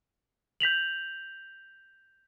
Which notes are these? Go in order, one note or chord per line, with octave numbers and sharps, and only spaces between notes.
G6 B6 F7 F#7